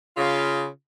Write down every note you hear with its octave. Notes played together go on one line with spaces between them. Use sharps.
C#3 F4